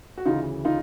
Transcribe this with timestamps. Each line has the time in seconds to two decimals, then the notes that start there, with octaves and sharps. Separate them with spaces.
0.18 F#4
0.26 D2 C#3 E3 D#4 F4
0.65 D#4 F4